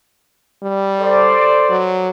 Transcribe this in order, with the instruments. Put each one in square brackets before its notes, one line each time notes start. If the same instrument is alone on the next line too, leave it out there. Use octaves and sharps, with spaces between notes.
[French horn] G3
[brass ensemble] A4 C5 D5
[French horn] F#3